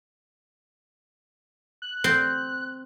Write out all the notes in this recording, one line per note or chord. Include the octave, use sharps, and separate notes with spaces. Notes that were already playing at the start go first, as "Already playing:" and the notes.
F#6
C4